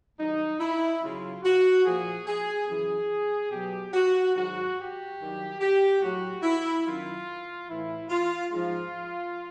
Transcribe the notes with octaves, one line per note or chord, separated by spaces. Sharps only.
G2 D#3 F#3 D#4
E4
F#2 C#3 F#3 F4
F#4
A#2 F3 G#4
G#4
F#2 C#3 E3 G#4
B2 F#3 G4
F#4
G#2 D#3 F#3 F#4
G4
G2 D#3 F#3
G4
A2 F#3 F#4
E4
F#2 D#3 F#3 F4
A2 E3 E4
F4
G#2 F3 F4